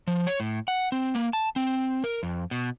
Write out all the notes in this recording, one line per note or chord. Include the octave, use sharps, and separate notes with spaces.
F3
C#5
A2
F#5
C4
A#3
A5
C4
A#4
F2
B2